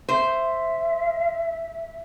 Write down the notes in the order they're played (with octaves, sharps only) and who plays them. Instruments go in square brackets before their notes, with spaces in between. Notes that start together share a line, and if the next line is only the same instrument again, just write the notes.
[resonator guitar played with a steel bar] C5 [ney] E5